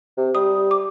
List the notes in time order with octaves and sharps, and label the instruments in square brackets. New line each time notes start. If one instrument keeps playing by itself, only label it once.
[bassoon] C3
[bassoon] G3 [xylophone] D#6
[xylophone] D6